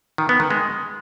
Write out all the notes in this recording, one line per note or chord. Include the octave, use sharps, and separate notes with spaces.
D#3
B3
D#3
G#3